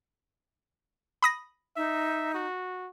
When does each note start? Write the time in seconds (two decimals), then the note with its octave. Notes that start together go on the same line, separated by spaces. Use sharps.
1.22 B5 D#6 A#6
1.77 D#4 E5
2.35 F#4